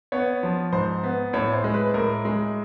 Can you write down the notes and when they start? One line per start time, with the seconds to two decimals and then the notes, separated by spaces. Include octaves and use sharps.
0.12 B3 C#5
0.43 F3
0.72 G#2 C5
1.03 B3
1.33 A2 C#5
1.53 C5
1.64 G#3
1.74 B4
1.94 A2 A#4
2.25 G#3